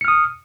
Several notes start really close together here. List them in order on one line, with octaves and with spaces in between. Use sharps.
C#7 F6 D#6